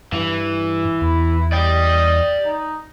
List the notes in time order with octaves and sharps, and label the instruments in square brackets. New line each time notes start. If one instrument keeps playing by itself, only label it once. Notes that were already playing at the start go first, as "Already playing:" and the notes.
[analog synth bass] G2 [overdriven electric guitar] E3
[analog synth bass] E2 [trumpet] E4
[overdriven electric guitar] D5 G5 [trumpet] D#5
[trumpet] D#4